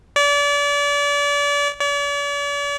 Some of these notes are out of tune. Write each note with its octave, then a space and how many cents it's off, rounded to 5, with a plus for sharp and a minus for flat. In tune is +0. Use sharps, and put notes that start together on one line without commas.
D5 -35
D5 -45